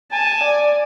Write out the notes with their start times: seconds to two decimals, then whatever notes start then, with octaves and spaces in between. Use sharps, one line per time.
0.12 G#5 A5
0.44 D5